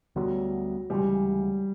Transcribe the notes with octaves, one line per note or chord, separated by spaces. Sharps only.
D2 D3 F#3 G3 B3
D2 C#3 E3 G3 G#3